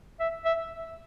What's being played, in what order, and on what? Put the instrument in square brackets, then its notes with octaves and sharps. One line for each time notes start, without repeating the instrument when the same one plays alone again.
[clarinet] E5
E5